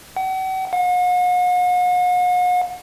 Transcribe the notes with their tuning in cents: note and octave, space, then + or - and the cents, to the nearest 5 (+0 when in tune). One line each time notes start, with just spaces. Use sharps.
F#5 +40
F#5 -45